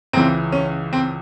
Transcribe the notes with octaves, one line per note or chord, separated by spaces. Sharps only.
C#2 C#3 E3 C4
C#4
C4